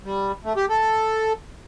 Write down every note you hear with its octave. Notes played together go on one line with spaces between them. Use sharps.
G3
A3
G4
A4